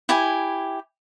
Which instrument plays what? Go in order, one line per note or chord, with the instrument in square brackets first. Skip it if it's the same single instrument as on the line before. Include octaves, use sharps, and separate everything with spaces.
[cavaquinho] E4 G4 G#5